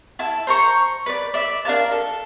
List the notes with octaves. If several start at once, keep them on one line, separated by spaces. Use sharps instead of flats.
E4 A5
C5 A#5 C#6
B4 D5
D5 E5
D4 A#4 F5 A5
A4